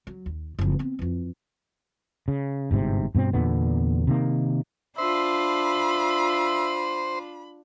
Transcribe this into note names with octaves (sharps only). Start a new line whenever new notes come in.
F#3
D#2
F#1 F2
B3 C4
F2 E3
C#3
G1 G#2 C3
G2 B2 A#3 C4
E2 A#2 D3 B3
C3 D#3 A#3
D4 F4 C5 E5 B5